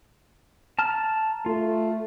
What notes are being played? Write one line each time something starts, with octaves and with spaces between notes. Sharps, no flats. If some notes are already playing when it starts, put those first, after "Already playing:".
A5 A#5 F6
A3 F4